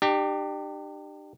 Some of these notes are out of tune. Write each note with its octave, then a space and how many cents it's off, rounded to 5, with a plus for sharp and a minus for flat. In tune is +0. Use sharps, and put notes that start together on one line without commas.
D4 +45 G4 +0